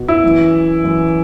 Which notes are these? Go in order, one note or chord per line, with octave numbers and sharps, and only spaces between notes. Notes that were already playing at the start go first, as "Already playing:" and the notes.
Already playing: B2
E4
F#2 E3
F#2 E3